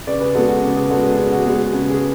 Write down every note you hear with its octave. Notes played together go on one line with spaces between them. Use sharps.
C#3 B4 D5
G#4 B4
G#3 B3 F#4 A4
F#4
C#3 G#4
G#4
G#3 B3 F#4 A4
G#4
C#3 G#4
F#4
G#3 B3 G#4
C#3 G#4
G#4